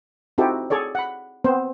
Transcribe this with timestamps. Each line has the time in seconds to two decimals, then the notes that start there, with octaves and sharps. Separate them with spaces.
0.38 C4 D#4 E4 F#4 G4 A4
0.70 G#4 A4 C#5 D5
0.95 F#5 B5
1.44 B3 C4 C5